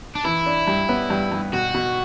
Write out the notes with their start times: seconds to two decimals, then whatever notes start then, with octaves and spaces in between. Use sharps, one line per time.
0.15 D4
0.25 E3 E4
0.46 D4
0.67 G2
0.89 B3
1.10 G2
1.32 G2
1.53 B2 F#4
1.74 B2